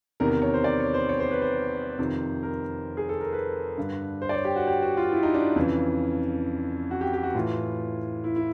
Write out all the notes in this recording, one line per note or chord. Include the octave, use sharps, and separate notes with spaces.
E2 C3 D#3 A#4
A#4
C#5
C5
D5
C#5
C5
C#5
C5
B4
C5
F2 C3 D#3
A#4
G#4
A4
A#4
B4
G2 D3
C5
D5
C#5
G4
F#4
G4
F#4
F4
E4
D#4
D4
F2 C#3 E3
F#4
G4
G4
F#4
A2 E3 F4
E4
E4